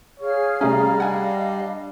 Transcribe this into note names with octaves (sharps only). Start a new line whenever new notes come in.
G#4 C#5 F5 F6
C3 G3 A3 C#4 A#5
D4 D#5 F5 F#5 G#5